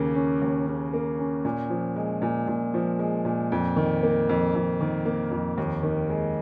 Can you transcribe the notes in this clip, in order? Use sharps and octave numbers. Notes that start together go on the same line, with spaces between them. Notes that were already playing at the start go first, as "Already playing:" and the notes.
Already playing: D#2 C#3 A#3
C#4
D#2
C#3
A#3
C#4
A#2
F3
G#3
A#2
A#2
F3
G#3
A#2
F2
D#3
A#3
F2
F2
D#3
A#3
F2
D#2
D#3
G#3